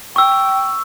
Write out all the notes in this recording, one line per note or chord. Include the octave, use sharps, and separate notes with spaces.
G5 C#6 E6